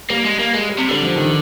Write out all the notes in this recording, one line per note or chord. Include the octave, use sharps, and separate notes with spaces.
G3 A#3
G#3
A#3
G#3
G3
C3
D3 G3
F3
D#3